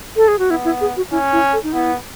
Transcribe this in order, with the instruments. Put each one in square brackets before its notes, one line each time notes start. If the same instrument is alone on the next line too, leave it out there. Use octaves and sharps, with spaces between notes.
[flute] A4
G#4
F#4
[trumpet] B3 [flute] E4
[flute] E4
G#4
F#4
[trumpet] C#4 [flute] E4
[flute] E4
A4
D#4
[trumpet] B3 [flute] E4